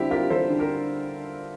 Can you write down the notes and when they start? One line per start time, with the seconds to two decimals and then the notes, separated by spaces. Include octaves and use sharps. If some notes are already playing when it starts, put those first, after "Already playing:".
Already playing: D3 G3 C4 E4 G4
0.10 F4 G4 A#4
0.30 G3 A4 C5
0.50 D3
0.59 G4 A#4